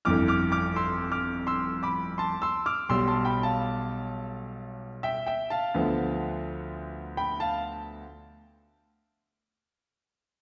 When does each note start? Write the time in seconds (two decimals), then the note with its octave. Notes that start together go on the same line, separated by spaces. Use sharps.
0.05 G1 F2 E3 D6 F6
0.28 D6 F6
0.52 D6 F6
0.76 C6 E6
1.12 D6 F6
1.47 C6 E6
1.83 B5 D6
2.18 A5 C6
2.42 C6 E6
2.66 D6 F6
2.89 B1 B2 G3 C6 E6
3.08 A5 C6
3.25 G5 B5
3.43 F5 A5
5.03 E5 G5
5.26 E5 G5
5.50 F5 A5
5.74 D2 D3 F3 B3
7.17 G5 B5
7.40 F5 A5